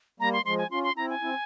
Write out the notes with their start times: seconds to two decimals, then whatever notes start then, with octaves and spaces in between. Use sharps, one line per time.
0.20 G3 A#3 A#5
0.33 C6
0.45 F3 G#3 C6
0.58 G#5
0.71 C#4 F4 C6
0.83 C6
0.97 C4 E4 A#5
1.10 G#5
1.22 C4 E4